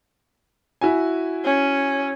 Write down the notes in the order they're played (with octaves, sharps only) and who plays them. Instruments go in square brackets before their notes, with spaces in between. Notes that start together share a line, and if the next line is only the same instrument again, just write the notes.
[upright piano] E4 F#4 G#5
[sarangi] C#4